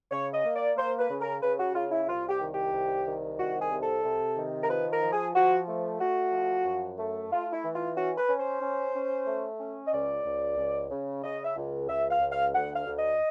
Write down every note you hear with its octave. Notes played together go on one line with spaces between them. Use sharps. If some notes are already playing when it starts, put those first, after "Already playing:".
C#3 C#5
D#5
A#3
D5
A#3 C5
B4
C#3
A#4
C#3 B4
F#4
C#3 F4
E4
C2 F4
G4
D#3
G4
C2
D#3
C2 F#4
G#4
C3
A4
C3
D#3
A#4
F3 B4
A#4
F3
G#4
F3 F#4
A3
A3 F#4
F3
F#2
A3
A3 F4
E4
E3
F4
C#4 F#4
B4
C#4
C5
C#4
C#4
A3
C#4
D#5
C#2 D5
C#2
C#2
C#3
C#3 D#5
E5
C#2
C#2 E5
F5
C#2
F5
D2 F#5
F5
D2
D#5